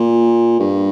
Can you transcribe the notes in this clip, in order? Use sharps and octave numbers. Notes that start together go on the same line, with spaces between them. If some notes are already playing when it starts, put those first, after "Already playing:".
Already playing: A#2
G2